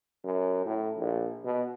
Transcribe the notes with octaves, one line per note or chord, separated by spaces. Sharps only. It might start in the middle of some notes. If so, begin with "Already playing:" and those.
F#2
A2
A#1
B2